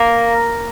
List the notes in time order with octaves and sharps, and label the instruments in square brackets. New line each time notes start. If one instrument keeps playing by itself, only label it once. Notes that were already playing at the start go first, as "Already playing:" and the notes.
Already playing: [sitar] A#3